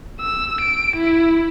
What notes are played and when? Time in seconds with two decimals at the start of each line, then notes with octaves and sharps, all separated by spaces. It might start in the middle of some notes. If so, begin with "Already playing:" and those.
0.21 E6
0.61 D7
0.97 E4